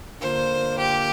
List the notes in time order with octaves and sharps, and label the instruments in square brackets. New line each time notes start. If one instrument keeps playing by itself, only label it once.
[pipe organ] D3 A#3 F4 [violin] C5
[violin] G4